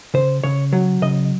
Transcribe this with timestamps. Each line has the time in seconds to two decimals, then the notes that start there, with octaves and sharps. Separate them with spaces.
0.14 C#3 C5
0.44 C#3 C#5
0.73 F#3
1.02 C#3 D#5